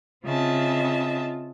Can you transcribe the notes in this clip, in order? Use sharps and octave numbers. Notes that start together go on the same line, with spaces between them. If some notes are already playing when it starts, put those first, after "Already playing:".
C#3 C4 F4 D#5 E5 A5